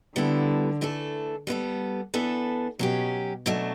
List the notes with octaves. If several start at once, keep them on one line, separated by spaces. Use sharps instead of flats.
D3 G3 B3 E4 A4
E3 A3 D4 A4
G3 B3 E4 A4
E3 B3 D4 A4
B2 F#3 C#4 G4
B2 F#3 A3 D4